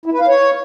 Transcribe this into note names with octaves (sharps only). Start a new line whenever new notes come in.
E4
B4
F5
C#5